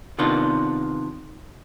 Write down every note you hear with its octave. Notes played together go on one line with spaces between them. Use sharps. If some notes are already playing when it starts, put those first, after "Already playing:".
C3 D#3 B3 D4 F4